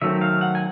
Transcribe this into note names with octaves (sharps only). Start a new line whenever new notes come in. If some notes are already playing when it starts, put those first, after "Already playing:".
D#3 F#3 A3 C4 E5
F5
F#5
G#5